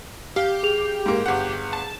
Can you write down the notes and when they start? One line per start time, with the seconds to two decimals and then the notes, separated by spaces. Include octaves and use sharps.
0.36 G4 F5
0.63 G#4 F7
1.06 G#2 A#3
1.26 G1 F#5
1.73 A5